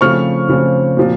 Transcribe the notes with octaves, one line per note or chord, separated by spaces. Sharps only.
C#3 F3 A3 C4 C#6 F6
C#3 F3 A3 C4
A#2 F3 C4